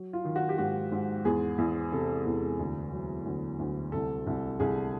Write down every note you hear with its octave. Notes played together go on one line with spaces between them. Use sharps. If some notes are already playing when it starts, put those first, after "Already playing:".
Already playing: F#3
F4
D#3
F#4
G4
G#2 F#4
G#2
E2 G#4
E2
C3 A4
E2
D2
F#3
D2
D2
C2 A4
C2
C2 G#4